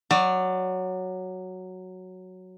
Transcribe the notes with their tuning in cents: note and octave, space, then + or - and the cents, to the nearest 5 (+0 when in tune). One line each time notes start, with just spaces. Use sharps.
F#3 +0 D5 +25